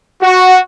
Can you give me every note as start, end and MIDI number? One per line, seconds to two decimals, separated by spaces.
0.22 0.58 66